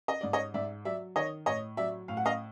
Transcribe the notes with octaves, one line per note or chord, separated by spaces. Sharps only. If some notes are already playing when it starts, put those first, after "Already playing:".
D#5
G#2 D5
C#5 D#5
G#2 D5 E5
F#3 D5 E5
D#3 C#5 D#5
A2 C#5 D#5
F#3 D5 E5
A2 F5
F#5
D#5 F5